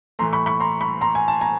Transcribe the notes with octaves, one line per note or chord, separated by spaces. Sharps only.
A2 E3 A3 A#5 C6
B5 C#6
B5 C#6
A#5 C6
B5 C#6
A#5 C6
G#5
A5
G#5 A#5